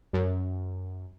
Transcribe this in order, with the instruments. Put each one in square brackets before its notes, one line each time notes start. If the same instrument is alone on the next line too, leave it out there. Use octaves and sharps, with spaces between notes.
[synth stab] F#2